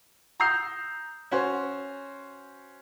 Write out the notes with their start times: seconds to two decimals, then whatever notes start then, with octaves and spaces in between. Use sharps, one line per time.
0.40 A#5 D#6 E6 G6 C7
1.31 C#4 F#4 C5